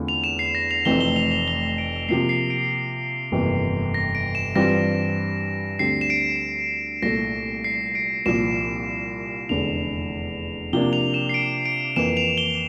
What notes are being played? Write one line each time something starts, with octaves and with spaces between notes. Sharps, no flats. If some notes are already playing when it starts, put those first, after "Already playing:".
Already playing: E2 D3 A3 C4 F4
F7
E7
C7
A#6
F7
F1 F2 E3 A3 C4 G7
G7
F7
F7
G7
D7
C3 F3 A#3 C7
C7
D7
G1 F2 C3 E3 A#3
A#6
D7
E7
G2 E3 G3 C4 F4 A#6
D2 D3 G3 C4 C7
E7
D7
C2 A#2 A3 A#6
C7
D7
C2 A#2 F3 E7
F1 E2 D3 F7
C3 F3 A#3 D4 G7
F7
E7
C7
D7
D7
F2 E3 A#3 E7
F7
G7